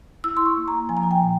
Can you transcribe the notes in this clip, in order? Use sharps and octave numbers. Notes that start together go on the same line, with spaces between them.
E4 E6
C6
C#6
A#3
A#5
F3 G#5
A#5
G#5
G5
A#2